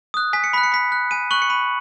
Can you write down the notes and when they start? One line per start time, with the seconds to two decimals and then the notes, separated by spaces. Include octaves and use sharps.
0.14 D#6 F#6
0.33 G#5 B6
0.44 C#7
0.53 B5 F#6 B6
0.63 C#7
0.72 B5 B6
0.92 F#6
1.11 G#5 D#7
1.31 C#6 F#6 F#7
1.42 C#7
1.50 B5 D#7